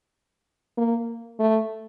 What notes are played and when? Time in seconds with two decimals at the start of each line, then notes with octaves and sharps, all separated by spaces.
0.77 A#3
1.39 A3